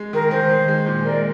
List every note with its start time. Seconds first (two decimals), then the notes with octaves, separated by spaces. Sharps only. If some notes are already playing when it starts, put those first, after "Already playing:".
Already playing: G#3
0.13 D#3 A#4
0.31 D#3 C5
0.50 D#3
0.68 G#3
0.86 A#2
1.05 G#3 A#4 D5